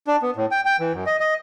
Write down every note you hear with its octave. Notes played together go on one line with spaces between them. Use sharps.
D4
B3
A2
G5
G5
E3
F#2
D#5
D#5